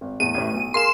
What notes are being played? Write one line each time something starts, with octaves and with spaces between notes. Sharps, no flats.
G#1
E2 A2 D#7
A1 A2
B1
G#4 A#4 F5 C6 E7